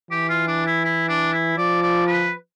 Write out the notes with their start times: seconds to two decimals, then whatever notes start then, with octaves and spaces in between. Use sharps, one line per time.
0.11 E3 G4
0.29 F4
0.47 D4
0.66 E4
0.85 E4
1.09 D4
1.33 E4
1.58 F3 D5
1.82 D5
2.07 B4